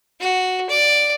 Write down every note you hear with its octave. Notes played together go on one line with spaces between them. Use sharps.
F#4
D5